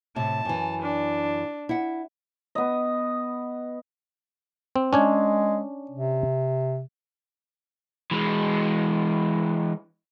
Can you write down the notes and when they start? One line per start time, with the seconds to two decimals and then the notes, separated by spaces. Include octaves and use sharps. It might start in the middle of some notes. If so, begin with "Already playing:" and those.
0.16 A2 C3 A5
0.45 F#2 E3
0.82 D4
1.69 E4 F#5
2.55 B3 D#5
4.76 C4
4.93 G#3 C#4 D4 C#5
5.91 C3
8.11 E3 G#3